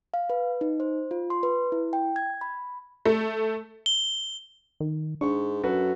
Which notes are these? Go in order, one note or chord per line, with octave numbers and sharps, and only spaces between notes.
F5
B4
D#4
C5
F4
C6
B4
E4
G5
G#6
B5
A3
G7
D#3
G#2 D4 C#6
F#2 F#4 A4 B4